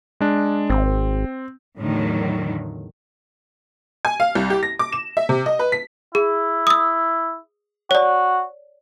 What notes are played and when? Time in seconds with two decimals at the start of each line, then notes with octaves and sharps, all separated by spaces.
0.21 G#3 D4
0.70 G#1 C4
1.78 E2 A2 D3 D#3 F#3
4.05 G#5
4.20 F5
4.35 C2
4.50 G4
4.63 A#6
4.79 D6
4.92 E7
5.17 E5
5.29 C3
5.46 D#5
5.59 B4
5.72 B6
6.15 E4 G#4
6.67 D#6 E6
7.91 F#4 C#5 D5